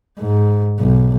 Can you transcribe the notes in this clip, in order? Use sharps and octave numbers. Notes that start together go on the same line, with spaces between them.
G#2
B1